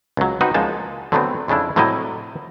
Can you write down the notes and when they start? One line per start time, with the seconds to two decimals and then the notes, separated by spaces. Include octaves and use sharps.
0.17 C#2 F#3
0.41 C4 D#4 F#4 B4
0.54 C#2 F3 G#3 A#3 D#4 A5
1.12 D3 F#3 A3 B3 C4
1.48 F2 C#3 A3 D4 E4
1.76 A2 C3 F#3 G3 E4 D#5